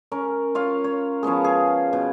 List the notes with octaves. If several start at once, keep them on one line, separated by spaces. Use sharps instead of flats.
C#4 A#4
F4 C#5 F5
C#5
F3 B3 C#4 G#4
G#4
B2